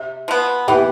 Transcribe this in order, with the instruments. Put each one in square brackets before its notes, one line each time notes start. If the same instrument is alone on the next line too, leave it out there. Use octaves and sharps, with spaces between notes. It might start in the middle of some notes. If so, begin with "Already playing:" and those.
Already playing: [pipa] C3
F3 B3
[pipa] E3 [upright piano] G4 B4